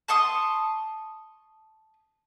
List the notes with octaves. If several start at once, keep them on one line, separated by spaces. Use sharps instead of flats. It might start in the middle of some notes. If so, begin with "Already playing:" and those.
A5 C6 C#6 D#6